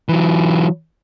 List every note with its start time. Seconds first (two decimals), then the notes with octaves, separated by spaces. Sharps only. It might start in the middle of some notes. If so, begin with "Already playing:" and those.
0.09 E3 F#3